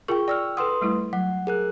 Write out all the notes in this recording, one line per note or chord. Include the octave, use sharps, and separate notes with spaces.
F4 G#4 A#4 G5 C#6
D5 G5 E6 F6
A4 B4 F#5 C6 D#6
G3 A3 E4
F#3 F#5
G#4 A#4 F#6